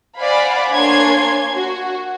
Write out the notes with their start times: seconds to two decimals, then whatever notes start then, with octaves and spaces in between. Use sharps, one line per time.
0.18 C5 D5 F5 F#5 G#5 B5
0.71 A#3 D4 C#5 G#5 C6 G#6
1.53 F#4